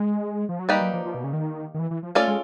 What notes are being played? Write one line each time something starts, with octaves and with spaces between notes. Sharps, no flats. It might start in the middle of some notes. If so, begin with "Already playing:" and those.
Already playing: G#3
F3
F#3
G3 A#3 D#4 G4 B4 D5
F#3
F3
F3
B2
C#3
D#3
D#3
E3
E3
F3
A3 C#4 F4 A4 D5
G#3